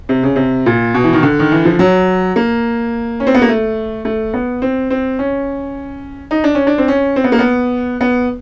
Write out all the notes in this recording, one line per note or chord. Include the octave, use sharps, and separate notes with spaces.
C3
C#3
C3
A#2
B2
E3
D#3
D3
D#3
E3
F3
F#3
A#3
C#4
C4
B3
A#3
A3
A3
B3
C4
C4
C#4
D#4
D4
C#4
D4
C4
C#4
C4
B3
A#3
B3
B3